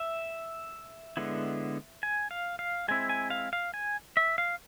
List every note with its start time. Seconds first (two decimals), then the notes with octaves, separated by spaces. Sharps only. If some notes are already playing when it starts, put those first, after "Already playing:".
Already playing: E5
1.17 D3 G#3 B3 E4
2.03 G#5
2.31 F5
2.59 F5
2.88 G#3 C4 E4 G#5
3.09 G#5
3.30 F5
3.53 F5
3.74 G#5
4.17 E5
4.38 F5